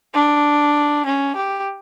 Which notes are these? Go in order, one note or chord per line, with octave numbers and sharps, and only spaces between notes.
D4
C#4
G4